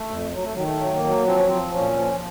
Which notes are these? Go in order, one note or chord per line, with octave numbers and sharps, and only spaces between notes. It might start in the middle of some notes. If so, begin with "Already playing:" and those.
Already playing: A3
F2
F#3
A3
D#3 F#3
A3
F#3
A#3
F#3
F3 C4
C#4
F3 C4
A#2 C#4
F3